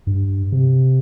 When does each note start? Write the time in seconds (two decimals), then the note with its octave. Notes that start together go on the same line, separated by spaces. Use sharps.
0.07 G2
0.52 C3